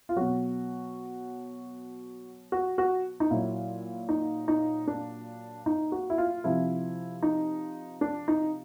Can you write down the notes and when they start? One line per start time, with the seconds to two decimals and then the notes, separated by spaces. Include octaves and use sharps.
0.09 F4
0.16 B2 F#3 F#4
2.52 F#4
2.78 F#4
3.20 D#4
3.31 A#2 F#3 E4
4.09 D#4
4.48 D#4
4.88 D4
5.66 D#4
5.92 F#4
6.10 E4
6.18 F4
6.44 C3 F3 E4
7.23 D#4
8.01 D4
8.28 D#4